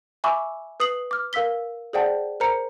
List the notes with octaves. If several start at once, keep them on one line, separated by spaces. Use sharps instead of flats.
E5 G#5 B5 C#6 D6 E6
B4 D#6 C7 F#7
D6 F6
A#4 F5 E6 B6 G7
G#4 C5 D5 F#5 G5 A5
A#4 C5 A#5 C#7